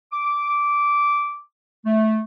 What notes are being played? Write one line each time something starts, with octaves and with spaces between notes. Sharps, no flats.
D6
A3